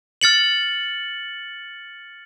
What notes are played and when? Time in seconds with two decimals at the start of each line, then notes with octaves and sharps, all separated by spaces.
0.21 F6 A6 C#7 F#7